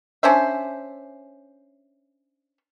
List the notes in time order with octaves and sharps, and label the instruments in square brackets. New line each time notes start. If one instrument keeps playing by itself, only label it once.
[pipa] C#4 D4 C5 E5